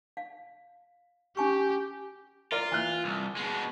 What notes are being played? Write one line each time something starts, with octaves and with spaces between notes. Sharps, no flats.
F5
C#4 G4 G#5 C#6
F4 A#4 D5
E3 F#6
C2
B2 G#3